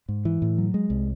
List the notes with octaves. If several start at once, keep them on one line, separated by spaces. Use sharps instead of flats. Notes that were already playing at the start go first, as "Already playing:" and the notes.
G#2
E3
A2
F#3
G#3
C2